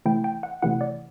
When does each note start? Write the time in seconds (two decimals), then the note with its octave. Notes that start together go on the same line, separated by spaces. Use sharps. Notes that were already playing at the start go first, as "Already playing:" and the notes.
0.05 C3 E3 A3 E4 G5
0.24 G5
0.43 F#5
0.62 C3 E3 A3 E4 F#5
0.81 D5